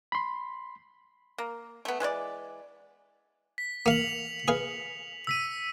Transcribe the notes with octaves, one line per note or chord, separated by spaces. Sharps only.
B5 C6
A#3
A3 B3
E3 G#3 C5 D5
B6
A#3 F5 C#7 F7 F#7
G#4 B4 F5
E6 B6 D#7